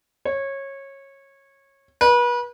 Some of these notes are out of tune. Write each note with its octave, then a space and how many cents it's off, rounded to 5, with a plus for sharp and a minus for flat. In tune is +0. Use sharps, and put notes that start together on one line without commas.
C#5 -20
B4 -35